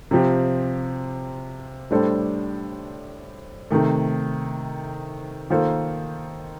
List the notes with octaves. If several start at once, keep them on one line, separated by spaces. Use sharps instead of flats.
C3 F3 C4 G4
A2 G3 D4 A4 C5
C3 D#3 A3
D#3 A#3 F4 A4 C5